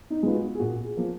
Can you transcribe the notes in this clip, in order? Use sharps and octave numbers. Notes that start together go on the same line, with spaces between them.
D#4
G#3 B3 F4
F#4
G#4
A#2 F#4
G#4
F3 A#3